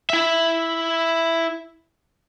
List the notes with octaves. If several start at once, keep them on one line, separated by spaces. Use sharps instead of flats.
E4 E5